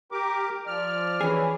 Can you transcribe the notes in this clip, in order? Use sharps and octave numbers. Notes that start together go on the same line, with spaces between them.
G4 A#4 D6
F3 D5 F6
E3 C#4 G#4